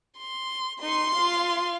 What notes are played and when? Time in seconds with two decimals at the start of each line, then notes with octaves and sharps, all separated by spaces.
0.18 C6
0.82 D#4 C6
1.14 F4 F5